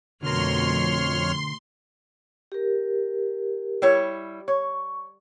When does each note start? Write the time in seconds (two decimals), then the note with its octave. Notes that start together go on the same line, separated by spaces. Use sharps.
0.23 F2 B2 D3 A3 A#4 C#5 C6 F6
2.52 G4 A#4
3.82 G3 E4 C#5
4.48 C#5 C#6